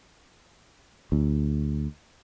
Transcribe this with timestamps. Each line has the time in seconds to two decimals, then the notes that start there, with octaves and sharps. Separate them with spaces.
1.12 D2